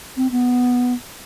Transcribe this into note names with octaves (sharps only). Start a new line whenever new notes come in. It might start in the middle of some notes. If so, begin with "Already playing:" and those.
C4
B3